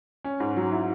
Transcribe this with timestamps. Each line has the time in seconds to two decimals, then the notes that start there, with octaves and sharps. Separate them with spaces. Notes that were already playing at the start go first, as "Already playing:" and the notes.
0.24 C#4
0.40 G#2
0.57 F#3
0.72 E4